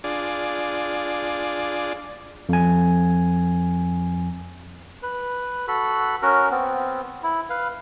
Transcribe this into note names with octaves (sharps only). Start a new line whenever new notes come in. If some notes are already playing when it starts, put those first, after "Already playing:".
D4 F4 G#4 D5
F2 G#5
B4
F#4 A4 B5
C#4 F#4 A#4
B3 C4
E4
B4 F5